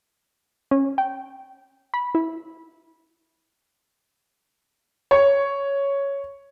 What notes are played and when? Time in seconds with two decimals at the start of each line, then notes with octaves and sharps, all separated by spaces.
0.71 C#4
0.98 G5
1.94 B5
2.15 E4
5.11 C#5